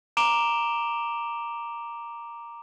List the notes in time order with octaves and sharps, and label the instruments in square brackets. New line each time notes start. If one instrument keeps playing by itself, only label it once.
[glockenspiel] A#5 D6 D7 E7 F7 G7